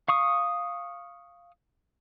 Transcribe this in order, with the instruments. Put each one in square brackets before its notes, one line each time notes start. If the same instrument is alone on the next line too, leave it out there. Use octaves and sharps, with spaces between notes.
[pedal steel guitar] F5 C#6 D#6